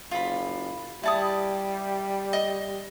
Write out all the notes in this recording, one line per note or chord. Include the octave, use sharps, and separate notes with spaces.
F#1 F4 B5
G3 E4 A5 D#6
D#5